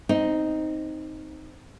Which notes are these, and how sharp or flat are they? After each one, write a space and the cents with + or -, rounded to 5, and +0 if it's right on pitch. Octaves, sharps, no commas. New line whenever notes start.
C4 +0 D#4 +0